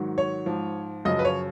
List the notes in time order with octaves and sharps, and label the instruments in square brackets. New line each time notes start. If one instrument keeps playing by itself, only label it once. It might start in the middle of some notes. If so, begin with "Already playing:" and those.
Already playing: [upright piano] G#2 D#3 F#3
C#5
G#2 F3
F#2 C#3 F3 D#5
B4
C#5